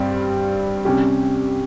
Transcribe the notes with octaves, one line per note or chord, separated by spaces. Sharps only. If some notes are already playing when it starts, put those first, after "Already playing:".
Already playing: G2 G3 C4
C3 G3 C#4 G4